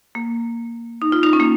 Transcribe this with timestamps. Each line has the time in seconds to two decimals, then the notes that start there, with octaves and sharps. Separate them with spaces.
0.15 A#3
1.02 D#4
1.12 F4
1.23 D#4
1.33 C#4
1.40 A#3